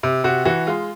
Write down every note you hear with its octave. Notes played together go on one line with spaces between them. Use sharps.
C3
C3 F#4
E3 F#4
G#3 F4